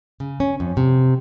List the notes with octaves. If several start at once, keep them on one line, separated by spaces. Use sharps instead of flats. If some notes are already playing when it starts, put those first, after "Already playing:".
C#3
C#4
F2
C3